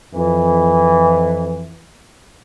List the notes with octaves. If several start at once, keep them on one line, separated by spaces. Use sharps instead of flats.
F2 E3